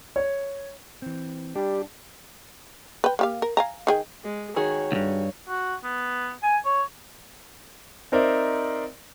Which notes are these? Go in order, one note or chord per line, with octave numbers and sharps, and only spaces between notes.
C#5
E3 C4
G3 D4 G4
B4 G5
A#3 G4 F5
A#4
F5 G#5 A#5
D#3 G#4 G5
G#3
D#3 F#4 G#4 C#5
D2 G2
F#4
B3
G#5
C#5
C4 D#4 A#4 C5 D5 E5